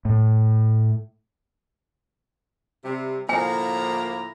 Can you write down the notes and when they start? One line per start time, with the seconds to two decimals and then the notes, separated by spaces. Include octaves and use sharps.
0.05 A2
2.85 C3 G3
3.29 A2 D3 F3 A#3 E4 G#5 A#5